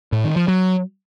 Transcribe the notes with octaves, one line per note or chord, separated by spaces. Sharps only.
A2
D#3
F3
F#3